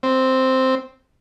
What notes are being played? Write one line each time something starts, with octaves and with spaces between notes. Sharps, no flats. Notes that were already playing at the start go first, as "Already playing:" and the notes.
C4